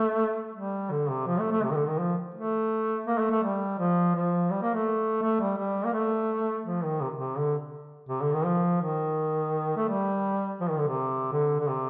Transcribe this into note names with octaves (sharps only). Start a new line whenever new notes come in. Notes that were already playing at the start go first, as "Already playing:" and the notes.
Already playing: A3
G3
D3
C3
F3
A3
A3
C3
D#3
D3
D#3
F3
A3
A#3
A3
A3
G3
F3
F3
G3
A#3
A3
A3
G3
G3
A#3
A3
F3
D#3
C3
C3
D3
C3
D3
D#3
F3
D#3
A3
G3
F3
D#3
D3
C3
D3
D3
C3